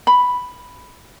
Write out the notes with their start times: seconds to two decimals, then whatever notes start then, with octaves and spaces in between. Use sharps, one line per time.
0.07 B5